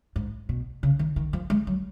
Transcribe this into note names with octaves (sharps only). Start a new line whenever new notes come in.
G#2
B2
C#3
D#3
D#3
F3
G#3
F#3